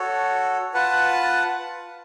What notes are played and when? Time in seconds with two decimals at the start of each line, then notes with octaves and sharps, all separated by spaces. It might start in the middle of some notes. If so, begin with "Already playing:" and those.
Already playing: F#4 A4 C#5
0.74 F4 B4 F#5 A5